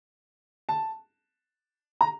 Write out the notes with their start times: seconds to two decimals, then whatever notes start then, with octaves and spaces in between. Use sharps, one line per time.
0.69 A5
2.01 A#5